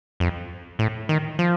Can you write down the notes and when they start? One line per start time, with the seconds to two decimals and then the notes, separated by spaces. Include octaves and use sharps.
0.20 F2
0.79 A2
1.09 D#3
1.39 F3